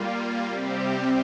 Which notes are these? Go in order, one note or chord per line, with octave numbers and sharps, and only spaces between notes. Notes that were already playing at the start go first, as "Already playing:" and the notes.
Already playing: G3 A#3 F4
C3 G3 C4 G4